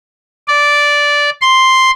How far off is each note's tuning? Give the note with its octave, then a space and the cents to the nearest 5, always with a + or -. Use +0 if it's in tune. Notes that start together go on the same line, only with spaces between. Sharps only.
D5 -10
C6 +0